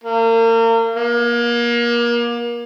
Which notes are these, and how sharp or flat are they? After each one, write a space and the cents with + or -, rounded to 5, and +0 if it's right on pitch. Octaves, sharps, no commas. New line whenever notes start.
A#3 -35
A#3 +30